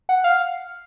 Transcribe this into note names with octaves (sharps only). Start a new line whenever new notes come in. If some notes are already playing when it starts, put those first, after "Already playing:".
F#5
F5